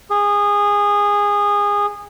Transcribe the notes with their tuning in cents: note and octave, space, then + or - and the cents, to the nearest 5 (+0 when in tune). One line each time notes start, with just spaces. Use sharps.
G#4 -20